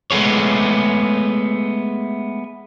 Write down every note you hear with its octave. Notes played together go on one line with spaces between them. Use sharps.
G#3 A3 B3 G#4 C#5